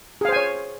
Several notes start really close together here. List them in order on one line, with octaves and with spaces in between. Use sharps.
G#4 F5 C5 G#5 C#5